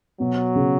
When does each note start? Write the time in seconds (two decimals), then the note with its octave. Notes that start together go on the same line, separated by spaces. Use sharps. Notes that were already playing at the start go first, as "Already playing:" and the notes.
0.20 B2 F#3
0.55 C#3